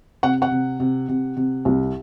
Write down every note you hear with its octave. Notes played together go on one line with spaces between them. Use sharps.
C3 F#5
F#5
C3
C3
C3
C3
C2